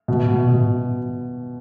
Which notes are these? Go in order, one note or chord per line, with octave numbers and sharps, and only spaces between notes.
B2
B2
B2